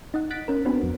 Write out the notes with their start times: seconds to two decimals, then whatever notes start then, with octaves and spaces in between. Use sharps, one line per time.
0.14 D#4 D#5 F#5
0.30 F#6 A6 B6 D7
0.48 C#4 A#4
0.65 B3 C4 D4 F#4 B4
0.83 F2